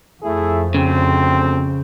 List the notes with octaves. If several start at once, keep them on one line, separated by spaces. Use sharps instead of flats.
F2 A3 E4 G#4
D2 C#3 C4